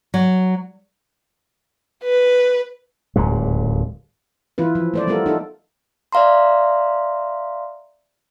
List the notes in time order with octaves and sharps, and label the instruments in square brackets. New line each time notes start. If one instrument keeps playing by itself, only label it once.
[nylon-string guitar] F#3
[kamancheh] B4
[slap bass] D1 D#2 A#2 G#3
[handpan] E3 E4 F4 B4
F3
A3 C5 D5
G3 A3 B3 F4 A4 A#4
D#4 F4 A4
[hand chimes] D5 E5 F5 A#5 C6